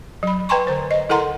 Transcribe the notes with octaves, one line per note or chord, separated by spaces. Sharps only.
F#3 B5
B4 G5 G#5 A#5 C6 C#6
D3 C5
D#5
E4 A4 A#4 F#5 A#5 C6